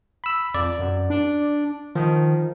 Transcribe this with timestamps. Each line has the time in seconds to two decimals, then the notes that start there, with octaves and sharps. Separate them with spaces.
0.24 B5 E6
0.55 F2 D5
0.79 F#2
1.10 D4
1.95 D#3 F3